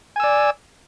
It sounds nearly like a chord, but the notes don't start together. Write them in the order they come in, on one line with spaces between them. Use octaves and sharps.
G#5 E6 D5